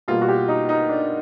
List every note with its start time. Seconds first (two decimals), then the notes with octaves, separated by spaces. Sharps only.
0.08 B2 G3 A#3 F4
0.21 F#4
0.29 G4
0.48 D#4
0.69 D#4
0.89 D4